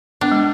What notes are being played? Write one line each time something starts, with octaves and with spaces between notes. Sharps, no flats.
B3 D4
G#3